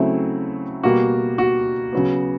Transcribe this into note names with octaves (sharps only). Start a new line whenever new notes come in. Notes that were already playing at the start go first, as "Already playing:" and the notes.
Already playing: C#3 F#3 A3 C4 E4
B2 G3 A#3 F#4
F#4
C#3 F#3 B3